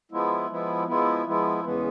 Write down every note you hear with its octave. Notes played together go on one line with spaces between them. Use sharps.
F3 G#3 B3 E4
F3 G#3 B3 E4
F3 G#3 B3 E4
F3 G#3 B3 E4
E2 C#3 E3 G#3 B3